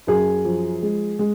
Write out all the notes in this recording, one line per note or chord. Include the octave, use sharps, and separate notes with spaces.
F#2 G#4
F3
G#3
G#3